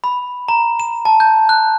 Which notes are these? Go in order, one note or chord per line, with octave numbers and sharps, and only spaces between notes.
B5
A#5
E7
A5
G6
F#6